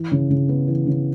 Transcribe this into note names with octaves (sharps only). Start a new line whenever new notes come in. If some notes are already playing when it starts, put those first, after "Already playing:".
Already playing: E3
C#3
C#3
B3
E3
C#3